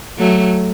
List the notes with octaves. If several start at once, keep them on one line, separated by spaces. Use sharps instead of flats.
F#3 A3